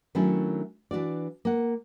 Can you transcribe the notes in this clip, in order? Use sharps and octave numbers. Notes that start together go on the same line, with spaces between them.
D#3 F#3 A3 C#4 D4 E4
E3 D4 F#4 D5
A#3 F#5